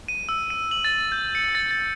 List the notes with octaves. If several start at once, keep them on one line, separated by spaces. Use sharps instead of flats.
D#7
E6
D#7
F#7
A6
G6
C#7
A6
A6